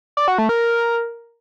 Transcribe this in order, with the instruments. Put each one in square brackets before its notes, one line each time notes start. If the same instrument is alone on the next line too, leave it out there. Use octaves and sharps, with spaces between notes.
[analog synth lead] D5
F#4
A3
A#4